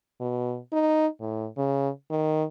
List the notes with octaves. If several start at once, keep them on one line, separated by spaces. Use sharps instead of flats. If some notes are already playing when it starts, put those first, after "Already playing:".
B2
D#4
A2
C#3
D#3